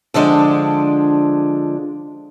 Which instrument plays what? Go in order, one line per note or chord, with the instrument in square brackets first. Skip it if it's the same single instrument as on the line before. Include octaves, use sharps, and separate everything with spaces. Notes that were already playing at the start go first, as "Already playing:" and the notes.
[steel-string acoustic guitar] D3 F3 G#3 D4